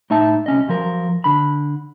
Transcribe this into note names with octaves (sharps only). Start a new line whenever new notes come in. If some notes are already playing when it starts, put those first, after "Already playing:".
A2 D#4 E5 A5
C2 C#4 D#5
F#2 F3 A#4
D3 B5